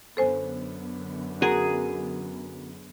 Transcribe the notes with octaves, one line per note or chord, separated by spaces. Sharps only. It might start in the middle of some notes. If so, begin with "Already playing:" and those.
F#2 D3 B3 A4 C5 G#5
F#4 G#4 A#4